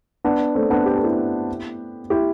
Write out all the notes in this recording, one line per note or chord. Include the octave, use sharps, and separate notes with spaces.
B3 D4
A3 C4
B3 D4
G4
A4
E4 G4
E4 G4